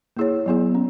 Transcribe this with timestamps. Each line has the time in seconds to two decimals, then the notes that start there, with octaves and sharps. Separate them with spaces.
0.17 A#3 E4 G#4 C#5
0.46 F#3 B3 E4 G#4
0.75 C#4